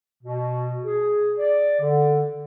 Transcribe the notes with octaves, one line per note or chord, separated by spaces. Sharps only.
B2
G#4
D5
D3